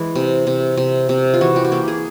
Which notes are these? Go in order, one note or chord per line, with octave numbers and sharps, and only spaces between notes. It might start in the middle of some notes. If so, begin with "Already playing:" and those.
Already playing: E3 G#3
C3
C3
C3
C3
F4
E3 F#4
G4
F#4
A#3 G4
G#4